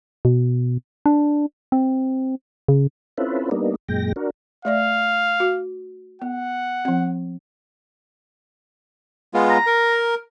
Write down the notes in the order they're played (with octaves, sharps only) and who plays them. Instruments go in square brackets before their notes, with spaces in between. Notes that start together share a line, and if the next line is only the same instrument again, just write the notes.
[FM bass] B2
D4
C4
C#3
[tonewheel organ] C4 C#4 E4 F4 A4 B4
G3 A#3 B3 D4 D#4
F#2 A#2 G#3 G5 A#6
D4 F#4 A#4
[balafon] A3 D5 E5 [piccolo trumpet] F5
[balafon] F#4
[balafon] B3 [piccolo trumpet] F#5
[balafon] F3 C4
[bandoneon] G#3 B3 F4
[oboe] A#5
[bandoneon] A#4